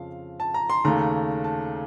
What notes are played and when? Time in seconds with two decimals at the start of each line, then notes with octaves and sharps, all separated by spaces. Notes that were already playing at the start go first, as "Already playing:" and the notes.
Already playing: F2 C#3 F3 F5
0.40 A5
0.54 A#5
0.70 C6
0.85 D#2 C#3 A3 A#5
1.44 A5